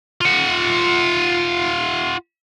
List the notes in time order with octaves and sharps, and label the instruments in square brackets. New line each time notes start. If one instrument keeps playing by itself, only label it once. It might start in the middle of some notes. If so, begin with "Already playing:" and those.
[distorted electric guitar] F4 F#5